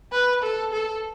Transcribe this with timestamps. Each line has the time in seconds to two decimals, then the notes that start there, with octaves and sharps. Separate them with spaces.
0.12 B4
0.43 A4
0.72 A4